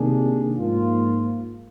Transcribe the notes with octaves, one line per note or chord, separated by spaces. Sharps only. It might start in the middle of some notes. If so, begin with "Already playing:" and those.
Already playing: C3 D#3 A#3 D4 G#4
G#2 F3 A#3 F4